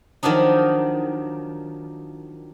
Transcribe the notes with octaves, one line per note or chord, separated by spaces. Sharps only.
D#3 F3 F#3 D4 D#4